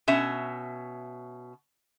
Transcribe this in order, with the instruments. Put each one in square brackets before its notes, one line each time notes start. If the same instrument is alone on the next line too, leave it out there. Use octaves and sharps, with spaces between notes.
[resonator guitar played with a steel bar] B2 C#4 E5